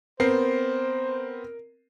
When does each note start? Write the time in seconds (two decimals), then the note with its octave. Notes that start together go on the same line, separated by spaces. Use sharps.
0.20 B3 C4 A#4 C5 C7